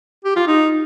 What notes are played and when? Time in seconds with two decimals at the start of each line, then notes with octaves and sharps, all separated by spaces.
0.25 G4
0.36 F4
0.47 D#4